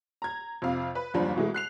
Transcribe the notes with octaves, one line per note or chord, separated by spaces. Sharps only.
A#5 G#6
F2 C3 F5
B4
F#1 D#2 F3 G3 D4 B5
B2 E3 G#3 A3
F#6 C7 F7